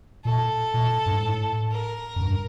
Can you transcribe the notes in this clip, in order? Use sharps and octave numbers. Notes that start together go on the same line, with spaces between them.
A#2 A4
A#2
G2
G#2
A2
A#4
F#2
G2